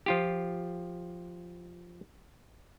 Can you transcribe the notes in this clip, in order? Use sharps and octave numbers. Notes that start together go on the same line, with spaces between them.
F3 F4 G4